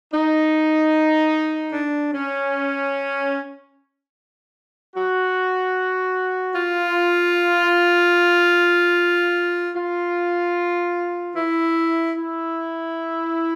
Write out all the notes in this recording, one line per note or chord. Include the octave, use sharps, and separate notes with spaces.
D#4
D4
C#4
F#4
F4
F4
E4
E4